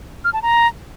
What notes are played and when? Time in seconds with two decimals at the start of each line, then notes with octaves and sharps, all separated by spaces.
0.24 F6
0.33 A5
0.42 A#5